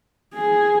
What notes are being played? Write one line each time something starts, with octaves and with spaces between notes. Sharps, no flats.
G#4